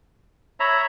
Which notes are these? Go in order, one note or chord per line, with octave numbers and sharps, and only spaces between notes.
C#5 E5 A#5 B5